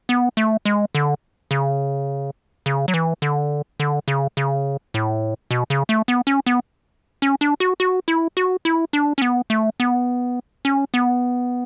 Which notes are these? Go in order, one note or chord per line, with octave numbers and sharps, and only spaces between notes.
B3
A3
G#3
D3
C#3
C#3
F#3
E3
D3
D3
C#3
C#3
A2
B2
C#3
A3
B3
C#4
B3
C#4
D4
F#4
F#4
E4
F#4
E4
D4
C#4
B3
A3
B3
C#4
B3